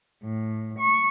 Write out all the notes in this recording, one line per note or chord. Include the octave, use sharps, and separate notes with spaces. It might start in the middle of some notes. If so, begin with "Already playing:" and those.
A2
C#6